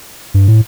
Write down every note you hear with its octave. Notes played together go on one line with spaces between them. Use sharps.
G2
A2